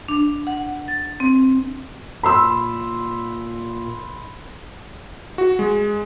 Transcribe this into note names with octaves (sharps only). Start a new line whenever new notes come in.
D4
F#5
A6
C4
A#2 B5 C6 E6
F#4
G#3